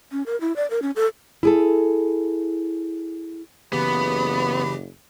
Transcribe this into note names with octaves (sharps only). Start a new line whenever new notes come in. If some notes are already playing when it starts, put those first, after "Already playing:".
C#4
A#4
E4
D5
A#4
C#4
A4
E4 G#4 A4
F#1 C#3 E3 B3 G4 B5